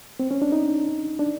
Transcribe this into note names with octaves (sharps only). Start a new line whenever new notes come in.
C4
C#4
D4
D#4
D4